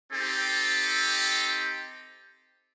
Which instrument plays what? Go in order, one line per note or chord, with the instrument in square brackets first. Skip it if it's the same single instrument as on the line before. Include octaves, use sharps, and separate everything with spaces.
[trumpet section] C4 D#4 G4 A4